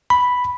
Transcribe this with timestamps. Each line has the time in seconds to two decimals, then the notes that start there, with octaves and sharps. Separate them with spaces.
0.10 B5